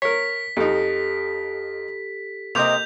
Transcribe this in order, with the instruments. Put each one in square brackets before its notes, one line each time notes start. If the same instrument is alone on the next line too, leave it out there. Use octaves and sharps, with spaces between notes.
[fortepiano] A#4 C#5 [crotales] B6
[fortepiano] F2 D#4 [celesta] G4 A4
[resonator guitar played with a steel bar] C3 C4 D#5 [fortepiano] A#3 D6 [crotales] G6 F7